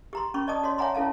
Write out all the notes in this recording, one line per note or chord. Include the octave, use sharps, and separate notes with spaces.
G4 A#5 C6
C#4 B5 C#6
D5 D#5 A5 D#6
F#4 C#5 C6
C#5 E5 F#5 G#5 A#5 C6
C#4 E4 A4 F5 A5